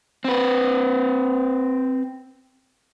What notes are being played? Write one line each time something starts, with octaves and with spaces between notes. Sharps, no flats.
C4 B4